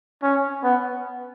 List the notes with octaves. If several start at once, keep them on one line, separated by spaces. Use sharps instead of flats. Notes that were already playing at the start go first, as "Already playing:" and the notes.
C#4
B3